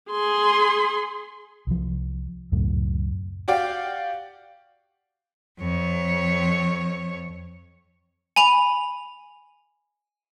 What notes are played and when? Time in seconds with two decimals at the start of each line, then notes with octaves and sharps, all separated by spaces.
0.11 G#4 C6
1.67 C2 F3
2.52 C#2 F#2 A2
3.48 F#4 G4 D5 F5 G5
5.60 F2 C#5
8.36 G#5 B5 F7